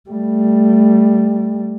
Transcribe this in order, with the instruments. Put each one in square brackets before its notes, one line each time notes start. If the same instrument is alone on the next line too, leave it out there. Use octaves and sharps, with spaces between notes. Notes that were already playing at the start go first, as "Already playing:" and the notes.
[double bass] G3 A3